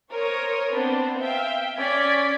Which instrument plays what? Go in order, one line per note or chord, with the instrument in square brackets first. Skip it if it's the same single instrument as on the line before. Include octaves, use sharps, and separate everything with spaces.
[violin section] A#4 C5 C#5 D#6
B3 C4 D4 B4 C5
E5 F5 G5
C#4 D5 G#6 B6